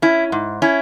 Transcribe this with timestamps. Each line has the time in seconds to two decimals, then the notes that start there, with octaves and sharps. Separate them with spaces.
0.02 C#4 E4
0.32 G#2
0.62 C#4 E4